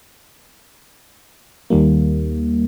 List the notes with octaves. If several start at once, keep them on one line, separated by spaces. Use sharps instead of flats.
D#2 D#3 G3 A#3